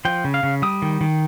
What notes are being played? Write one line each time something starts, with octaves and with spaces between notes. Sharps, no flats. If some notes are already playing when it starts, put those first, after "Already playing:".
F3 G5
C#3
F5
C#3
G3 D#6
D#3
D#3